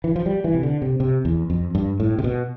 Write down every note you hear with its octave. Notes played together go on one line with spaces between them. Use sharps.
E3
F3
G3
E3
C3
D3
C3
C3
E2
F2
G2
A2
C3
B2